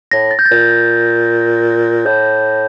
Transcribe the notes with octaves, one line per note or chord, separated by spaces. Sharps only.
A2 A#6
A6
G6
A6
A#2
A2 G6